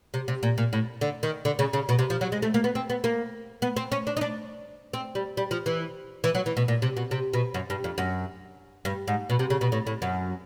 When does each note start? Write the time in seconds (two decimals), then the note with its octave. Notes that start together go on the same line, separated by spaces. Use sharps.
0.14 C3
0.28 C3
0.43 A#2
0.58 A#2
0.73 A2
1.01 D3
1.23 D#3
1.45 D3
1.59 C#3
1.73 C#3
1.89 B2
1.99 C3
2.10 F3
2.21 F#3
2.32 G#3
2.42 A3
2.54 A#3
2.64 B3
2.75 C4
2.90 B3
3.04 A#3
3.62 B3
3.76 C4
3.92 C#4
4.07 D4
4.17 D#4
4.21 D4
4.93 C4
5.15 G3
5.37 G3
5.51 F3
5.66 E3
6.24 E3
6.35 F#3
6.46 E3
6.57 B2
6.68 A#2
6.82 C3
6.97 B2
7.11 C3
7.33 B2
7.54 F#2
7.70 G2
7.84 F2
7.98 F#2
8.85 G2
9.08 G#2
9.30 B2
9.39 C3
9.50 C#3
9.61 B2
9.72 A2
9.87 A2
10.02 F#2